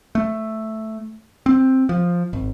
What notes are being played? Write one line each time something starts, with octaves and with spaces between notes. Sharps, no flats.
A3
C4
F3
G#1